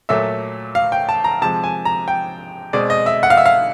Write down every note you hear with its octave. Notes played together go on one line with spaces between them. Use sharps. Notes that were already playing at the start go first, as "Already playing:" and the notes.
A#2 F#3 A3 E5
F5
G5
A5
A#5
C3 F3 G#3 A5
G#5
A#5
G5
B2 G#3 C4 D5
D#5
E5
F#5
F5
E5
F5